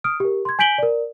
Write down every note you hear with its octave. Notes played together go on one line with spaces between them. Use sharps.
D#6 F6 D7
G4 A#4
C6 G#6
G#5 G6 B6 D7 F#7 G7
A#4 D5